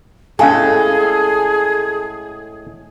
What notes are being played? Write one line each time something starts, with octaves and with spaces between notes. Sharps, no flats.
A2 G#3 C#4 G#4 A4 F5 G#5